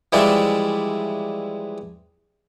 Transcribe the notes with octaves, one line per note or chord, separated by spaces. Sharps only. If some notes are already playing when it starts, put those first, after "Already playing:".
E3 F3 G3 G#3 D5 E5